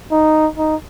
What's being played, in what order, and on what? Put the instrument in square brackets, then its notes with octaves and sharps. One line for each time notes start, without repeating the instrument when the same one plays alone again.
[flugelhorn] D#4
D#4